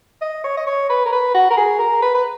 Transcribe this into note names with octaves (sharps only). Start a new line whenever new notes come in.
D#5
C#5
D#5
C#5
B4
A#4
B4
F#4
A#4
G#4
A#4
B4
B4